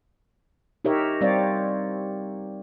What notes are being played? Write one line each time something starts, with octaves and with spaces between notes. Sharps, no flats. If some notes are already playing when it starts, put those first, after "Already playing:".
D#4 G4 A#4 C#5 E5
G3 C4 C#5 D5 F5